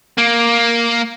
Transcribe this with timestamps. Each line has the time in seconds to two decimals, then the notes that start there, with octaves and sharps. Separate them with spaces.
0.18 A#3